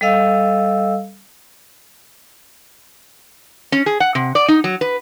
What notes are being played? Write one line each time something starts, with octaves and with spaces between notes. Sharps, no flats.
G3 A4 D#5 F5 E6
C#4
G#4
F#5
C3
D5
D#4
F#3
B4